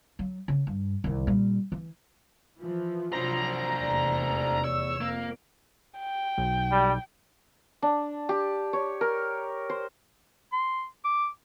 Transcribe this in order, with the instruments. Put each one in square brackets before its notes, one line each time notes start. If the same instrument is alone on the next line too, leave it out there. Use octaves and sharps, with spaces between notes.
[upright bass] F#3
C#3
G2
C2 D#3
A#2 G3
E3
[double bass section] E3 F3 [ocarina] F4
[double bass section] C3 F3 F#3 [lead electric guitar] D4 C5 [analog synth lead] A#5
[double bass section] F1 E2 [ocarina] D5
[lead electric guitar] C#5 [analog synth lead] E6
[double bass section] F2 [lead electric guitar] A#3
[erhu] G5
[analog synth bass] B1
[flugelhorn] G3
[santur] D4
G4
C#5
A#4
C5
[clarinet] C6
D6